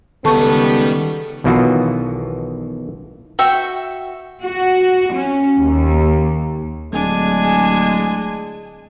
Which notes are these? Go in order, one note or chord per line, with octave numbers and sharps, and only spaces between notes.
C#2 D#3 G3 B3 A4 D#5 A5 C#6
B1 B2 D#3 E3 F4 F#4
F#4 E5 G5 C#6
F#4
C#4
D#2
D1 G#3 D4 G#5